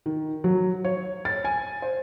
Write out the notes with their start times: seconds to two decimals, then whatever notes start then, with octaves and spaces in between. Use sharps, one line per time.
0.06 D#3
0.44 F#3
0.84 C#5
1.25 A6
1.45 G#5
1.82 C5